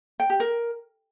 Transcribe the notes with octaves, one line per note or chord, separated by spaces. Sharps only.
G5
G4
A#4